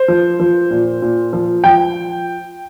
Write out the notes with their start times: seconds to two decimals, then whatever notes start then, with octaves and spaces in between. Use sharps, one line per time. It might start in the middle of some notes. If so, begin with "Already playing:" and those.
Already playing: C5
0.08 F3
0.40 F3
0.71 A#2
1.02 A#2
1.33 F3
1.64 F3 G5